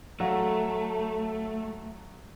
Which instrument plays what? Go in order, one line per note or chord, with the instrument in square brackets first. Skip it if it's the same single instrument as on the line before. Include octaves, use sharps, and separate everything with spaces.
[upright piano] F#3 F5 [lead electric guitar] A3